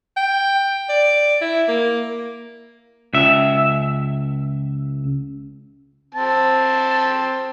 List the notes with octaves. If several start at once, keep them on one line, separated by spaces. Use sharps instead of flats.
G5
D5
E4
A#3
C#2 E5
C4 A5